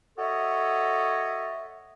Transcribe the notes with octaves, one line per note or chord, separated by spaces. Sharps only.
F#4 A4 C#5 D#5 E5